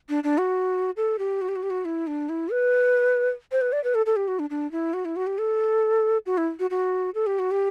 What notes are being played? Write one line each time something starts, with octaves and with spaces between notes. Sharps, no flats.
D4
D4
F#4
A4
G4
F#4
G4
F#4
G4
F#4
E4
D4
E4
B4
C5
B4
D5
B4
A4
A4
G4
F#4
D4
D4
E4
F#4
E4
F#4
G4
A4
F#4
E4
F#4
F#4
A4
G4
F#4
G4